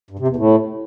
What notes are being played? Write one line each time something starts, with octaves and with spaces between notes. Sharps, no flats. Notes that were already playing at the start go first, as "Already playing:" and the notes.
G2
C3
E2
A2